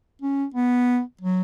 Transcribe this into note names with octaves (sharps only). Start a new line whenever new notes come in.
C#4
B3
F#3